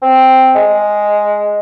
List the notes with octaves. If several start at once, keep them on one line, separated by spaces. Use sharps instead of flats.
C4
G#3